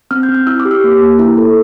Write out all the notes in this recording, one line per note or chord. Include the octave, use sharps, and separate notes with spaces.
C4 F6
G6
C4
F6
E4 E6
D6
G4
E6
A#3
A#3
E4
A4